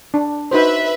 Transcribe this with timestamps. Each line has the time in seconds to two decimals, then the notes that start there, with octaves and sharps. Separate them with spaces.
0.14 D4
0.51 D#4 F#4 B4 C5 E5